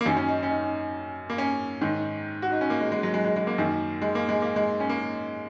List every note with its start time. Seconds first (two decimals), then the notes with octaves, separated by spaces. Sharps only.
0.01 A#3
0.06 F#2 D#3 C#4
0.17 C#4
0.29 D#4
0.43 C#4
0.50 D#4
1.30 A#3
1.38 C#4
1.81 G#2 D#3
2.42 F#4
2.52 D#4
2.61 C#4
2.70 A#3
2.81 G#3
2.92 G#3
3.03 F#3
3.14 G#3
3.24 G#3
3.36 G#3
3.47 A#3
3.58 F#2 D#3
4.02 G#3
4.15 A#3
4.29 G#3
4.42 A#3
4.56 G#3
4.80 C#4
4.89 A#3